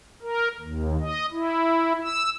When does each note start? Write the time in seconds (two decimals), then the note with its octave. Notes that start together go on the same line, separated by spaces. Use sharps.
0.22 A#4
0.59 D#2
1.00 D#5
1.32 E4
2.04 E6